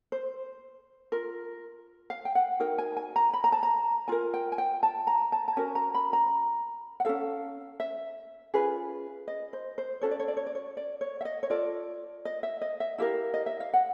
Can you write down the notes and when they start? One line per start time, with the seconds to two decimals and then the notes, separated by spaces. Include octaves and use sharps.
0.12 C5
1.12 F4 A#4
2.10 F5
2.25 G5
2.35 F#5
2.60 D#4 F#4 A#4 G5
2.78 G#5
2.97 G#5
3.16 A#5
3.33 B5
3.44 A#5
3.52 A5
3.63 A#5
4.08 F4 A#4 G#5
4.34 G5
4.52 G#5
4.58 G5
4.83 A5
5.07 A#5
5.32 A5
5.48 A5
5.57 C#4 F#4 A#4 G#5
5.75 A#5
5.94 B5
6.13 A#5
7.00 F#5
7.05 F4 A4 F5
7.09 C#4
7.80 E5
8.54 C#4 F4 G#4 B4
9.28 D#5
9.53 C5
9.78 C5
10.01 C#4 F#4 A4 C#5
10.11 D5
10.20 C#5
10.28 D5
10.37 C#5
10.46 D5
10.55 C#5
10.77 D5
11.01 C#5
11.21 E5
11.25 D#5
11.43 C#5
11.50 F4 A4 D5
12.25 D#5
12.43 E5
12.61 D#5
12.80 E5
12.98 E4 G4 A#4 F5
13.34 D#5
13.46 E5
13.60 F5
13.73 F#5